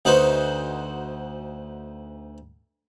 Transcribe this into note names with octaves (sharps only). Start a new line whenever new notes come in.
D2 D#4 F#4 B4 C5